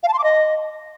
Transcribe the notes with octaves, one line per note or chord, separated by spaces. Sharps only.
F5
A5
C6
D6
D#5